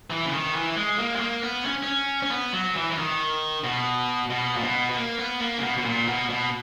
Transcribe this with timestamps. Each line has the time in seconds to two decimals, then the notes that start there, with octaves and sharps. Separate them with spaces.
0.10 E3
0.26 C#3
0.32 D#3
0.55 E3
0.76 G#3
0.99 A#3
1.15 G#3
1.20 A#3
1.43 B3
1.65 C#4
1.83 C#4
2.22 C#4
2.31 B3
2.53 F#3
2.76 E3
2.92 E3
2.98 D#3
3.64 B2
4.30 B2
4.57 A#2
4.63 B2
4.89 B3
4.96 A#3
5.18 B3
5.40 A#3
5.58 C#3
5.62 B2
5.78 B2
5.85 A#2
6.08 B2
6.30 B2